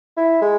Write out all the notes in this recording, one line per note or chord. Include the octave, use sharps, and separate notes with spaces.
E4
G#3